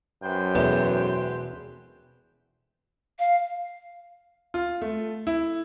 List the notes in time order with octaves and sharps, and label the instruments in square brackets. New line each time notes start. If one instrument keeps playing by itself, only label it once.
[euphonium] F#2 [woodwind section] B4 C5 G5
[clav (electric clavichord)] E2 [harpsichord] B2 G#3 A4
[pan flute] F5
[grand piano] F4
A3
E4